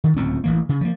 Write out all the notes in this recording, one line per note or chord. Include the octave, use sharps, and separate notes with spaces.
D#3
D1 C#2 C4 C#4
A1 E3 A#3
C#3
F3 A#3